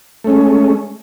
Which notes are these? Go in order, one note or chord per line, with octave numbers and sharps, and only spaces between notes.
G#3 A3 C#4